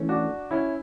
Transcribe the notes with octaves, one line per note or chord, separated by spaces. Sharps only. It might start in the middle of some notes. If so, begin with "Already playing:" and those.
Already playing: E3 A3 C#4
D4 F#4
C#4 E4